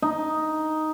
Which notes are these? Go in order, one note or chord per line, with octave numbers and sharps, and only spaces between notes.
D#4